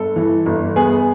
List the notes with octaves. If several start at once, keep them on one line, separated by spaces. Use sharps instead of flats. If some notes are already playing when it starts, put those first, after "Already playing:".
Already playing: G1 A4
E3
G1
B3 G#4